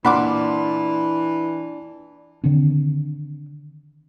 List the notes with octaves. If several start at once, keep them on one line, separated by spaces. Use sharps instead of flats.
A#2 E3 D4 F#5 B5 C6 D6
D3 D#3 C4 D4